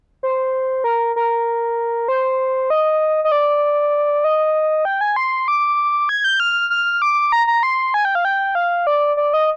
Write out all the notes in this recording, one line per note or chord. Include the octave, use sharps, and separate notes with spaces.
C5
A#4
A#4
C5
D#5
D#5
D5
D#5
G5
G#5
C6
D6
G#6
G6
F6
F6
D6
A#5
A#5
C6
G#5
G5
F5
G5
F5
D5
D5
D#5